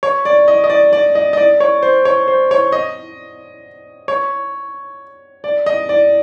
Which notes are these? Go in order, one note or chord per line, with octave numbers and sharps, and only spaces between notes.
C#5
D5
D#5
D#5
D5
D5
D#5
D#5
D5
C#5
C5
C#5
C5
C#5
D#5
C#5
D5
D#5
D5